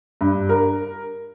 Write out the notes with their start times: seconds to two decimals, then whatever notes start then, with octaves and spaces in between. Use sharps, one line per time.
0.21 G2
0.49 A#4